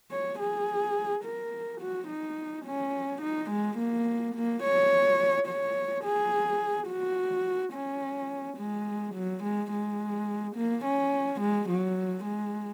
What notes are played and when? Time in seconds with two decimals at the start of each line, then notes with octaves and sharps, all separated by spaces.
0.11 C#5
0.39 G#4
1.24 A#4
1.81 F#4
2.08 D#4
2.65 C#4
3.22 D#4
3.50 G#3
3.78 A#3
4.35 A#3
4.63 C#5
5.47 C#5
6.04 G#4
6.88 F#4
7.73 C#4
8.58 G#3
9.15 F#3
9.43 G#3
9.71 G#3
10.56 A#3
10.85 C#4
11.41 G#3
11.69 F#3
12.25 G#3